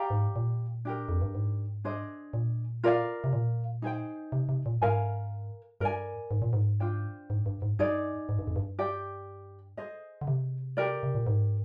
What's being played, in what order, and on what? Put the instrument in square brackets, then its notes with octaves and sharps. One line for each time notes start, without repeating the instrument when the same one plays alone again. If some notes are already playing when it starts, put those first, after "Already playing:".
Already playing: [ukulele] G4 D5 F5 A#5
[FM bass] G#2
A#2
[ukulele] D4 G4 A#4
[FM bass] F2
G2
G#2
[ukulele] D4 G#4 C5 D#5
[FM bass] A#2
[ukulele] F4 A#4 D5 F5
[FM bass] C3
A#2
[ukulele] D#4 G#4 C5 G5
[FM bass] C3
C3
A#2
[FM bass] G#2 [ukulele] A#4 F5 G#5
[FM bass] G2 [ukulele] A#4 D5 G#5
[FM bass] G#2
A#2
G#2
[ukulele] D4 F4 C5 G5
[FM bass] G#2
G2
G#2
[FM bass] G2 [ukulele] D#4 G#4 D5
[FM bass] G#2
G2
F2
G2
[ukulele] G4 D5 G5
G#4 C5 D#5
[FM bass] D3
C3
[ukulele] G4 A#4 D5
[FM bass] C3
A#2
G#2